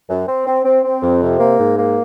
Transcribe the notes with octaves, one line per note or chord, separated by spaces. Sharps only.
F#2
C4
C4
C4
C4
F2
C3
A#3
G#2
A#3